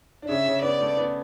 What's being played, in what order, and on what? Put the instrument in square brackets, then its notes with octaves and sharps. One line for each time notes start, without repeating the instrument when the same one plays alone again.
[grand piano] D4
[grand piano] C#3 C#4 [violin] E5
[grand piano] C#3 C#4
[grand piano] B3 [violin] D5
[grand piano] A3
B3